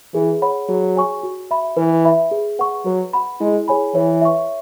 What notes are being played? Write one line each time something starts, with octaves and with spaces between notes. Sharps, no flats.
E3 G#4
C#5 F#5 B5
F#3 G#4
C#5 G#5 C#6
F#4
E5 B5
E3 B4
E5 B5
G#4
B4 F#5 C#6
F#3 B4
F#5 B5
G#3 E4
G#4 C#5 G#5 B5
E3 C#5
E5 C#6